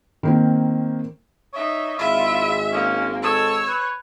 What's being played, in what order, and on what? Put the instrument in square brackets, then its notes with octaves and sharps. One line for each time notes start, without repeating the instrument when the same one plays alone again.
[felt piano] D#3 A#3 C4
[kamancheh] D#4 E5 [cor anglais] C#5
[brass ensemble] G#1 G#3 [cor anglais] E4 [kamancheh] F4 [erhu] E5
[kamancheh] A#3 [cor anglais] C#4
[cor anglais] A4 [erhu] C#5 [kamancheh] E6
[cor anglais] B4